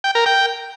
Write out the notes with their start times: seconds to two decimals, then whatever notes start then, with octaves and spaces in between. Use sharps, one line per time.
0.04 G5
0.15 A#4
0.26 G5